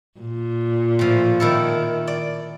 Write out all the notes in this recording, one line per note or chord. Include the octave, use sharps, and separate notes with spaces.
A#2
A2 F3
D#3 E4 A4
D5